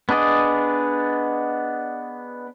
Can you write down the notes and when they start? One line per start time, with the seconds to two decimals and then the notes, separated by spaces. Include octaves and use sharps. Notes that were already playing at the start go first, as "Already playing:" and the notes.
0.09 B3 D4 G#4 D5 D#5